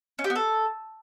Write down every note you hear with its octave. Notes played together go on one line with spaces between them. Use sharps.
C#4
G4
B3
A4